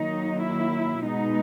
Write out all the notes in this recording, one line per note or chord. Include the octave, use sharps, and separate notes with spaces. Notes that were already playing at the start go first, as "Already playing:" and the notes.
Already playing: D#3 F#3 A#3 D#4
E4
B2 G#3 B3 D#4